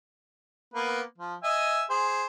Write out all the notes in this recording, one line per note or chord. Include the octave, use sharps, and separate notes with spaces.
A#3 B3 B4
F3
D#5 E5 G#5
G#4 C5